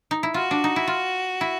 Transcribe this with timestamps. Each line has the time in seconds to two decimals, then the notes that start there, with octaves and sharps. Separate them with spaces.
0.11 D#4
0.23 E4
0.34 F4 F#4
0.51 D4
0.64 D#4
0.76 E4
0.88 F4
1.41 E4